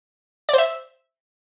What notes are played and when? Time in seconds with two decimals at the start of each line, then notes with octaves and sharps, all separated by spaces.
0.49 D5
0.53 C5
0.58 E5